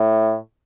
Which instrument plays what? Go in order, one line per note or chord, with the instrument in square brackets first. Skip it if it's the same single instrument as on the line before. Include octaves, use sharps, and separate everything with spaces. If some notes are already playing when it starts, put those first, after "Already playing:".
Already playing: [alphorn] A2